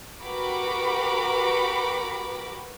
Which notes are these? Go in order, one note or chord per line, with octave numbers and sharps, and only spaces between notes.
F#4 G4 A#4 B4 B5 D6